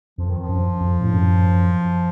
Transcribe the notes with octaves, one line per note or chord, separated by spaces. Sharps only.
F2 F3
D#3
F3
F#2
F2
A2
F#2